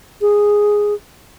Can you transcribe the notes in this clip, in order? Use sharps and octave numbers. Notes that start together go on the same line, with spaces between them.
G#4